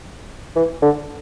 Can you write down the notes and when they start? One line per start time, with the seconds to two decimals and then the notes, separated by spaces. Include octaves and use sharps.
0.56 E3
0.82 D3